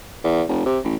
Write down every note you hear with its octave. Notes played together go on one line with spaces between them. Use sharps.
E2
F1
C3
A1